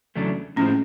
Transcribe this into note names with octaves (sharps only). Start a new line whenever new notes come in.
E2 C#3 F#3 A3 D4
A2 F3 G#3 C4 C#4